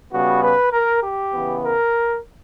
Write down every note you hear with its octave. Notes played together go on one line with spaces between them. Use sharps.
C#3 G3 B3 F#4
B4
A#4
G4
C#3 E3 B3
A#4